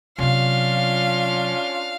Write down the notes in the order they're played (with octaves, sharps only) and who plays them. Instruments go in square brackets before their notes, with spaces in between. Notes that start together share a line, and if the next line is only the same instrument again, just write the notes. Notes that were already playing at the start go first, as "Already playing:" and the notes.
[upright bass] C3 F#3 [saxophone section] C#4 D4 F4 [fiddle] F5